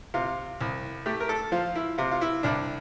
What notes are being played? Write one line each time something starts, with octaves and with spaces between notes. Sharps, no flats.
C3 F4
C2
A3 G4
A#4
A4
F3 F4
E4
C3 F4
F4
E4
C2 D4